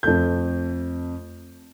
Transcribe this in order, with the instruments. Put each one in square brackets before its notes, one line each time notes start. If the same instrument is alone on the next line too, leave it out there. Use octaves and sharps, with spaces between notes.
[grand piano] F2 A3 G6